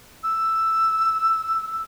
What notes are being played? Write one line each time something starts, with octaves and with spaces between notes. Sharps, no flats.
E6